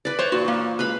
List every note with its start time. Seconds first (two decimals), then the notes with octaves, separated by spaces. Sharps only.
0.05 B4 D5
0.19 C5 C#5
0.32 A#2 F#4
0.48 A#3
0.79 C#2 B4 F5 B5